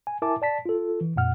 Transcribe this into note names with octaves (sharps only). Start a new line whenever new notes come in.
G#5
E4 A#4 E5 G#5 A5 D6
D5 A5 B6
F4 A4
E3
F2 A#2 F#5 F6